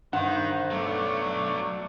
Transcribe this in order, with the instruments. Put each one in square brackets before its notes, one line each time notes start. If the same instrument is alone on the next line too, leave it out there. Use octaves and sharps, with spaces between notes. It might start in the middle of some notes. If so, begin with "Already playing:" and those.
[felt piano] G2 [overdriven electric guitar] D#3 [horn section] C5 [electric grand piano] F#5
[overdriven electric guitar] F#3 B3 [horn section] A3 D4